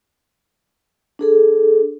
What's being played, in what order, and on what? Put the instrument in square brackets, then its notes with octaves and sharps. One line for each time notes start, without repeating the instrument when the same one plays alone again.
[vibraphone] D4 G#4 A4